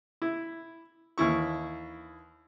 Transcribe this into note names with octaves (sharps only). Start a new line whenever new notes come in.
E4
D#2 E3 E4 C#6